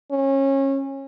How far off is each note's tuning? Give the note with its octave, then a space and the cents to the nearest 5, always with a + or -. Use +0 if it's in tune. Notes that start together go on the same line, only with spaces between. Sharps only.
C#4 -25